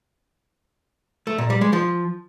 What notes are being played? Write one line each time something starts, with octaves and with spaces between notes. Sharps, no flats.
A3
A#2
G3
G#3
F3